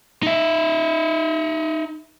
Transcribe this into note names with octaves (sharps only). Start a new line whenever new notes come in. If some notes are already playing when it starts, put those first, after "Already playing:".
D#4 E5